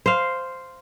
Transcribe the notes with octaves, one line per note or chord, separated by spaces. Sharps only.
C5 F5